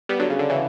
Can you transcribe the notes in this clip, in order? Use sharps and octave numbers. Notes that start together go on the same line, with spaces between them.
G3 B3
D3 F#3
C#3
D3
C#3 E3